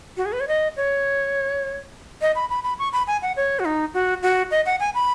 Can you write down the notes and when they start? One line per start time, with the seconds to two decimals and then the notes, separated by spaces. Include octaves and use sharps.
0.17 F#4
0.25 G#4
0.33 B4
0.40 C#5
0.48 D#5
0.77 C#5
2.21 D#5
2.35 B5
2.50 B5
2.63 B5
2.79 C#6
2.93 B5
3.07 G#5
3.22 F#5
3.37 C#5
3.59 F#4
3.65 D#4
3.94 F#4
4.23 F#4
4.51 D#5
4.66 F#5
4.80 G#5
4.94 B5